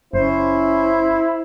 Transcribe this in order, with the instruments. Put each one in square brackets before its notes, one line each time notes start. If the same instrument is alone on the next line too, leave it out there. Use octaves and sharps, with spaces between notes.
[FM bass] F#1 [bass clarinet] C#4 [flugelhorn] E4 [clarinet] C5